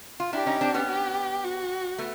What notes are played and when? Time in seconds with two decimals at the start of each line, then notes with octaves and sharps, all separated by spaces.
0.20 F4
0.33 D4 E4 G4
0.46 C#4 D#4
0.61 C4 D4
0.74 B3 C#4
0.88 G4
1.44 F#4
1.98 A3 B3